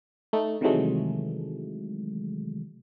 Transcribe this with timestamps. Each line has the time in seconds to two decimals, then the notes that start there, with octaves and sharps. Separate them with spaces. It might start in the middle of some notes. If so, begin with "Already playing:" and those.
0.33 A3 D#4
0.61 C3 D#3 E3 F#3 G#3 A3